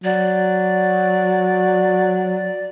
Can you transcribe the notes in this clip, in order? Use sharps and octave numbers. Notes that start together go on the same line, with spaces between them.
F#3 D5